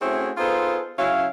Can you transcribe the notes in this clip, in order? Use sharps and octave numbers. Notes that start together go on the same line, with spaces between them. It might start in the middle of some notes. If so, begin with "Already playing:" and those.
A3 C4 C#4 E4 F#4 G#4
B3 D#4 F4 G#4 A4 C5
C#3 F#3 C#4 E4 F5